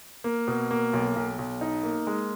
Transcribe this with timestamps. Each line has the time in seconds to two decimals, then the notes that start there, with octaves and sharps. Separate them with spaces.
0.24 A#3
0.48 B2
0.71 A#3
0.93 B1
1.16 B1
1.38 B1
1.61 D#4
1.83 A#3
2.07 G#3